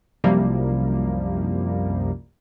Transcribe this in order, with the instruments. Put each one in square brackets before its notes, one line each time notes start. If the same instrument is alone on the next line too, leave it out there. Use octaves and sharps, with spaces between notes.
[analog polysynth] C2 F#2 C3 F3 G3 A#3